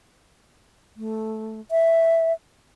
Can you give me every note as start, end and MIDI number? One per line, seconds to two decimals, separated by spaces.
0.97 1.60 57
1.71 2.33 76